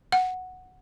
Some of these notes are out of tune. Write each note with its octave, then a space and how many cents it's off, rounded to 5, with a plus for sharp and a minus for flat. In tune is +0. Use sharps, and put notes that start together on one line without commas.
F#5 -5